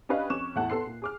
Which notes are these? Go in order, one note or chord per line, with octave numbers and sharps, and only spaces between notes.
C#4 D4 G4 B4 D#5 F5
F2 C#4 C#6 D6 F#6 E7
E2 A2 E3 F#5 A5 F#6
B3 A4 C6 C7
A#2
G#4 D6 F6